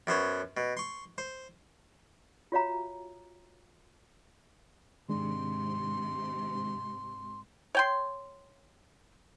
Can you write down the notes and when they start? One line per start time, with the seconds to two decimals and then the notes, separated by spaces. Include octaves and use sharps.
0.07 F#2 B3 C5 C#5
0.57 B2
0.77 C6 C#6
1.18 C5
2.52 F4 F#4 C#5 E5 F5 A#5
5.09 G#2 C3 D#3 G#3 D4 C6
7.75 C#5 G5 C6